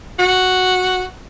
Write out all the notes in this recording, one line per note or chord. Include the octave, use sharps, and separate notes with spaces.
F#4